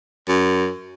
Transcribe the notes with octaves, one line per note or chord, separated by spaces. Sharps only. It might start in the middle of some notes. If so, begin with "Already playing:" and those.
F#2